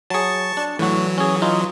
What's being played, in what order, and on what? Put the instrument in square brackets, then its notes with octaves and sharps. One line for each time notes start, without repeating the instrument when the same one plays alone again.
[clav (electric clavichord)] F#3 G#4 [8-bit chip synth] A5 C#6
[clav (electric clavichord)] D4
[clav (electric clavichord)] A2 F#4 [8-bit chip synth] E3 F#3
[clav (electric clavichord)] C#4 G#4
D#4 F4